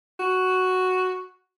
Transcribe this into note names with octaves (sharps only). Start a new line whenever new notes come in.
F#4